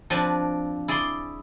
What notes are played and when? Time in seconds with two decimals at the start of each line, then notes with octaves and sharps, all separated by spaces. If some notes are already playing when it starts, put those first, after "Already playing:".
0.10 F3 C4 D4 B4 G#5 B5
0.88 E4 G#4 D5 B5 C6